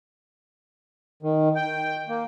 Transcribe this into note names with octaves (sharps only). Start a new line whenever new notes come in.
D#3
G5
A#3